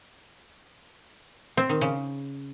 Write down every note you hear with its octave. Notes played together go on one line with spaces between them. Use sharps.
C4
D#3
C#3